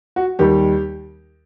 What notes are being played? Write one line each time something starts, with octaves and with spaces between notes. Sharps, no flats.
F#4
D#2 D#3 G3 G4